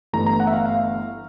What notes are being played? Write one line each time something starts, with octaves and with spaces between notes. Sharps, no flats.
G1 G2 E3 A3 A#5
A#5
F#5
E5
F5
F5